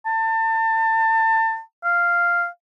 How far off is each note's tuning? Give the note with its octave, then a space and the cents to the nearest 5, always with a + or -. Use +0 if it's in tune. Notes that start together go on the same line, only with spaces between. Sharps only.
A5 +30
F5 -5